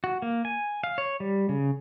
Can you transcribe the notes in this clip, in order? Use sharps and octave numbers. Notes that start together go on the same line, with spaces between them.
F#4
A#3
G#5
F5
C#5
G3
C#3